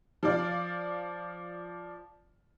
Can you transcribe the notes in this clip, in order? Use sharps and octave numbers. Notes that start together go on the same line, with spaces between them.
F3 D5 F5